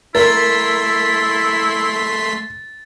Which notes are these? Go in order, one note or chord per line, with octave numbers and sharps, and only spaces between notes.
A3 E4 A#4 C6 A6 B6